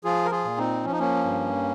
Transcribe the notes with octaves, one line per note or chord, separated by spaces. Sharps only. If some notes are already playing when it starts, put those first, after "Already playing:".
F3 F4 G#4
A#4
F4 G#4
A#2
C4 D#4
F3 C#4
D#4
A#3 C#4
G2